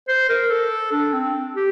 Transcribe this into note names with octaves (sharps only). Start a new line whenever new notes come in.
C5
A#4
A4
D4
C4
G4